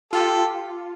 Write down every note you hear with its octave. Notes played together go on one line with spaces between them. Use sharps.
F4 G4 A4